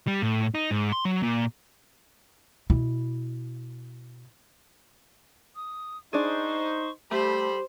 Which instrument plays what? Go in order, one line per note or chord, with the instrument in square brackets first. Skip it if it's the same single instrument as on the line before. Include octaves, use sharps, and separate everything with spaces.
[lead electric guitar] G3
A2
D#4
G#2
C6
F#3
A#2
[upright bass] B2 E4
[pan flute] D#6
[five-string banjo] D4 G#4 [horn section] D#4 C5 [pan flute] C#6
[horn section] G3 A4 B5 [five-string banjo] A3 [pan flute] G4 [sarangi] C5